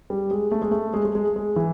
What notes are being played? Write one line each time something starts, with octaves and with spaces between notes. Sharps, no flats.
G3
G#3
A3
G#3
A3
G#3
G#3
G#3
G#3
E3